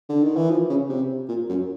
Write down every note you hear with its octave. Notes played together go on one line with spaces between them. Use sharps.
D3
D#3
E3
F3
C#3
C3
A#2
F#2